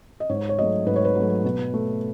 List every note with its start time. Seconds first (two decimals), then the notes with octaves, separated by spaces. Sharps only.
0.20 D#5
0.29 G#2 C#5
0.49 C#5
0.58 F#3 A3 D#5
0.86 G#2 B4
0.96 C#5
1.05 B4
1.15 F#3 A3
1.44 B2
1.74 A3